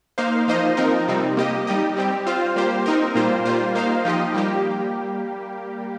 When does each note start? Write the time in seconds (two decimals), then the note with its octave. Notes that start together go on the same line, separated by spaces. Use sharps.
0.18 A#3 D#4 C5 F5
0.48 F3 A#3 D#4 C5 D#5
0.77 F3 C4 D#4 A#4
1.08 C3 G3 C4 D#4
1.37 A#3 G4 D#5
1.67 G3 D#4 G4 D#5
1.97 G3 C4 G4
2.27 C4 F4 C5 F5
2.56 G3 A#3 G4 C5
2.86 C4 D#4 A#4
3.15 A#2 G3 A#3 F4 C5
3.45 G3 A#3 F4 C5
3.75 A#3 D#4 C5 F5
4.05 F3 D#4 G4 D#5
4.34 G3 A#3 G4